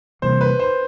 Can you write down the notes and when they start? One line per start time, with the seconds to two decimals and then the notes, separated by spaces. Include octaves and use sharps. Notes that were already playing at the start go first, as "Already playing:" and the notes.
0.22 C3 E3 G3 A#3 C5
0.41 B4
0.59 C5